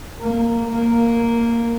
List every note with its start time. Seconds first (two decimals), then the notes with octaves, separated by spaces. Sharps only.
0.21 A#3
0.72 A#3